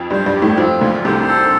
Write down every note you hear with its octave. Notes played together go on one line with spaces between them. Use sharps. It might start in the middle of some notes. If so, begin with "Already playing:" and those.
Already playing: F2 F3
G2 G3 C5
G2 G3
G4
A2 A3
F2 F3 C4
D2 D3 F4
C2 C3 C5
A4